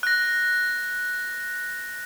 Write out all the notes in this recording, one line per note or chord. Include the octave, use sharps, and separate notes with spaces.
F#6 A#6